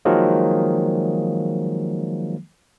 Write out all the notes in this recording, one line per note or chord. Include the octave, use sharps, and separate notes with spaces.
D#3 F3 F#3 G#3 A#3